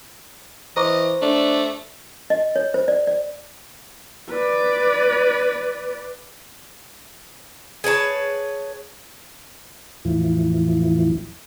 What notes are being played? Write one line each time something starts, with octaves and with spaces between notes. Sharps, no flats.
E3 C5 D#5 A#5 C#6 D6
A3 D4
D#5
C#5
C5
D5
D5
B4 D5
G#4 B4 C#5 A5
E2 A2 E3 F3